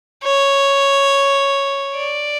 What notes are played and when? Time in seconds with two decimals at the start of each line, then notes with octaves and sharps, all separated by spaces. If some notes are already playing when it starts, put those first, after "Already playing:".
0.24 C#5
1.95 D5